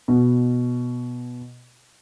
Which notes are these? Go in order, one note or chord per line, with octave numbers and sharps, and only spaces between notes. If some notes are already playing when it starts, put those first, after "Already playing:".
B2